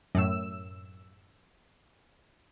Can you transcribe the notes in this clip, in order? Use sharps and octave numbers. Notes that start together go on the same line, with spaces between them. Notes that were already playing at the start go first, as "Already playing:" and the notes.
F#2 A2 E6